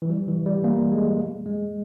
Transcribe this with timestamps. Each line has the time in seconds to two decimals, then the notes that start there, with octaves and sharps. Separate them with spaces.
0.02 E3
0.10 G3
0.28 E3
0.46 G3
0.64 A#3
0.92 G#3
1.46 G#3